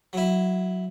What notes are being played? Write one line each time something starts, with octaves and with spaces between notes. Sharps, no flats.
F#3 E4